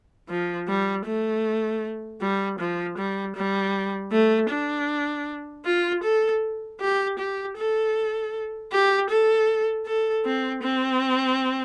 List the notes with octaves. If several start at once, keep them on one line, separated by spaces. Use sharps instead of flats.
F3
G3
A3
G3
F3
G3
G3
A3
D4
F4
A4
G4
G4
A4
G4
A4
A4
C4
C4